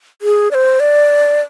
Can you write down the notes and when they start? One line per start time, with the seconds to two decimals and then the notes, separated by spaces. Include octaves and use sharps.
0.22 G#4
0.51 D5
0.54 C5
0.80 D5